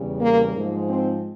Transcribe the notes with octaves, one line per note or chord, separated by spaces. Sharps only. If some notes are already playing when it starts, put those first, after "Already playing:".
Already playing: E2 C#3 G3
A#3
G#2 F3 G#3
C4